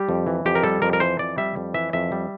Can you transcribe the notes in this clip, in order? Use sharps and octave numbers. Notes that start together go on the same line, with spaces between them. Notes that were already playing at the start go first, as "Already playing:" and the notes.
Already playing: G3 G4
F2
E3
F2 G4
A#4
G3 A4
F2 A#4
A#4
E3 C5
F2 D5
G3 E5
F2
E3 E5
F2 E5
G3